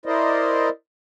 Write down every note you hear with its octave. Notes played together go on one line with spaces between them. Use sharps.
E4 A#4 C5 D5 D#5